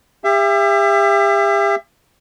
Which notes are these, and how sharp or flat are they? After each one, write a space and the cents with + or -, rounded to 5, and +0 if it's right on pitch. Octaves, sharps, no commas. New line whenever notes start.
G4 +35 E5 +30